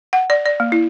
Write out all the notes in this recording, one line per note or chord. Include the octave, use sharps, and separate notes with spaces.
F#5
D5
D5
A#3
E4